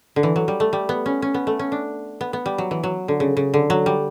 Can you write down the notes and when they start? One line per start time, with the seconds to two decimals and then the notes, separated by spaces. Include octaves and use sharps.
0.16 D3
0.23 E3
0.36 F#3
0.48 G3
0.60 A3
0.73 G3
0.89 B3
1.06 C#4
1.22 C#4
1.34 B3
1.47 A3
1.59 C#4
1.72 D4
2.21 B3
2.33 B3
2.46 G3
2.58 F#3
2.71 E3
2.83 F#3
3.08 D3
3.20 C#3
3.37 C#3
3.54 D3
3.70 F#3
3.86 G3